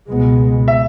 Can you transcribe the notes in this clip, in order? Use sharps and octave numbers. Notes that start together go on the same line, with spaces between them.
C#2 B2 G#3 B3
E5